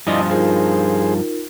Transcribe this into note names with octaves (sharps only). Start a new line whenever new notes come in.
G2 F3 E4 D5 D#5 G#5 C6 D#6
D#4 F4 G#4 A#4 C5